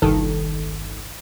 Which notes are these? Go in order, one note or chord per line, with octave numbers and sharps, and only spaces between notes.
G1 C2 G2 D#3 A4